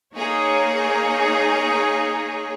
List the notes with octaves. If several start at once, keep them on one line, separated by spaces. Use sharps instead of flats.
A#3 D#4 G#4 C#5